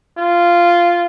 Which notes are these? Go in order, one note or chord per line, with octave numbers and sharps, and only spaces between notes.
F4